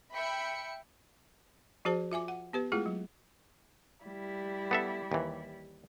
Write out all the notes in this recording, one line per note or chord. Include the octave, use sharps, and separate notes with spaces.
E5 G5 B5 C#7
F3 F#4 G#4 C5 A5
F4 E5 G#5 D6
F#5
B3 G4 B4
G#3 A3 E4 F4 G#4
F#3
G3 E4
B3 A4 E5
D#2 E3